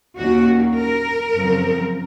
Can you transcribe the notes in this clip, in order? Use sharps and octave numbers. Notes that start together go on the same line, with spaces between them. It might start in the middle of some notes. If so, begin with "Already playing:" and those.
D#2 D#3 A#3 C#4 F#4
A#4
F#2 C#3 F3 C4